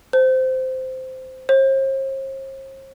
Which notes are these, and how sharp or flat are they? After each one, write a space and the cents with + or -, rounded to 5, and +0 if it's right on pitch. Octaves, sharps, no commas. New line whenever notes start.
C5 -10
C5 +45